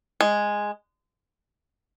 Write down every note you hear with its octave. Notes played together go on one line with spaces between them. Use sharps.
G#3